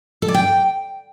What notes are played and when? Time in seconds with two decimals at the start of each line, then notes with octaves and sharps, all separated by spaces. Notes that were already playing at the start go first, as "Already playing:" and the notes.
0.22 A4
0.28 D5
0.34 G5